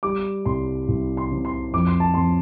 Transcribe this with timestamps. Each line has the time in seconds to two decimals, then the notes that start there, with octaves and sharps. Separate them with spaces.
0.03 G3 D6
0.45 C2 C6
0.88 C2
1.17 C6
1.31 C3
1.45 C6
1.73 F2 D6
1.87 C6
2.00 A5
2.14 F2 C6